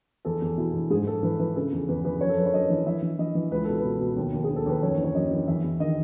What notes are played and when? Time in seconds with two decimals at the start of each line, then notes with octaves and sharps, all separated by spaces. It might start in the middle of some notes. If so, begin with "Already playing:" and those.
0.25 E2 A4
0.41 E2
0.57 B2 E4
0.74 E2
0.90 G#2 G#4
1.06 G#2 A4
1.23 E3 B4
1.39 E3 B4
1.56 C#3 A4
1.72 E2
1.88 E2 B4
2.05 E2 B4
2.21 F#2 C#5
2.29 A4
2.37 F#2 B4
2.46 C#5
2.53 F#2 D#5
2.70 E3
2.86 E3 E5
3.02 E3
3.19 E3 D#5
3.35 E3
3.51 C#2 B4
3.64 B2 A4
3.78 B4
3.84 B2
4.00 B2
4.16 D#2
4.33 D#2
4.44 G#4
4.50 D#2
4.56 A4
4.66 D#2 B4
4.82 F#2 C#5
4.98 E3
5.04 C#5
5.14 F#2 D#5
5.31 E3
5.48 E2 E5
5.64 E2
5.80 D#3 D#5